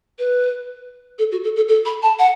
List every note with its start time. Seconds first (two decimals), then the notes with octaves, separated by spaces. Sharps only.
0.18 B4
1.18 A4
1.31 F#4
1.43 A4
1.56 A4
1.68 A4
1.85 B5
2.02 A5
2.19 F#5